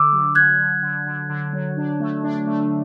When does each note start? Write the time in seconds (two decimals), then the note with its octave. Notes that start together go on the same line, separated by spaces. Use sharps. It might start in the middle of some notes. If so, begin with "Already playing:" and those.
Already playing: D3 D6 E6
0.13 F#3
0.35 D3 F#6 G#6
0.59 D3
0.83 D3
1.06 D3
1.30 D3
1.53 F#3
1.77 D4
2.00 A3
2.24 D4
2.47 A3